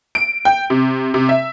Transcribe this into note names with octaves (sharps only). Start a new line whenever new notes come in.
D7
G5
C3
C3
E5